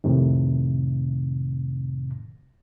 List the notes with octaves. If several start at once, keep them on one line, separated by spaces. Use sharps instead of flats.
F2 A2 C3 D#3